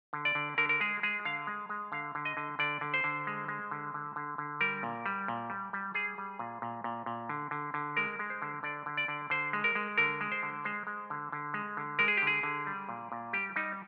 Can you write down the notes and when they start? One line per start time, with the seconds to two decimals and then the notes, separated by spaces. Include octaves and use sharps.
0.13 D3
0.25 D5
0.35 D3
0.58 D3 A#4
0.69 A#4
0.80 G#3 G#4
1.03 G#3 G#4
1.25 D3 F5
1.47 G#3
1.69 G#3
1.92 D3 F5
2.15 D3
2.25 D#5
2.37 D3
2.59 D3 D5
2.81 D3
2.94 C5
3.04 D3
3.27 G#3
3.48 G#3
3.71 D3
3.94 D3
4.16 D3
4.38 D3
4.61 G3 A#4
4.83 A#2
5.06 G3
5.28 A#2
5.50 G3
5.73 G3
5.95 G3 G#4
6.18 G3
6.39 A#2
6.62 A#2
6.84 A#2
7.06 A#2
7.29 D3
7.51 D3
7.74 D3
7.97 G#3 A#4
8.19 G#3
8.30 C5
8.42 D3
8.63 D3 D5
8.86 D3
8.97 D5
9.08 D3
9.30 D3 C5
9.53 G#3
9.64 A#4
9.75 G#3
9.98 D3 A#4
10.21 G#3
10.32 C5
10.43 D3
10.64 G#3 C5
10.87 G#3
11.10 D3
11.32 D3
11.54 G#3
11.77 D3
11.99 G#3 A#4
12.08 G#4
12.17 G4
12.22 D3 G#4
12.43 D3
12.67 G3
12.89 A#2
13.12 A#2
13.33 G3 G4
13.56 G3 D#4